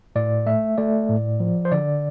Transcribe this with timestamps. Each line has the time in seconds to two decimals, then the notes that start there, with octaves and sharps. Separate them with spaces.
0.16 A2 D5
0.46 A3 E5
0.78 A3 D5
1.09 A2
1.40 F3
1.65 C5
1.72 D3 D5